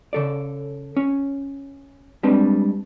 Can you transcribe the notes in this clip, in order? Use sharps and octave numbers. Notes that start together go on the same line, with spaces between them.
C#3 A4 D5
C#4
G3 G#3 C4 D4 B4